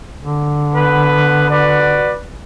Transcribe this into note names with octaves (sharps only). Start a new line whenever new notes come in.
D3
B3 B4
F#4 B4 D5